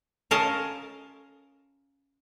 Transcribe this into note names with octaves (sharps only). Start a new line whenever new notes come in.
C#4 F4 A#4 D#5 A5